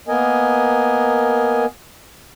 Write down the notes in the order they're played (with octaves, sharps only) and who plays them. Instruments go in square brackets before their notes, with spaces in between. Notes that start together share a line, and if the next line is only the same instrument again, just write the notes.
[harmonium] A#3 B3 A#4 D#5 G#5